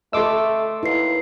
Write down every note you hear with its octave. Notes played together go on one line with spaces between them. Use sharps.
A3 A4 D#5 C6 D6 E6
D#2 E4 B4 C7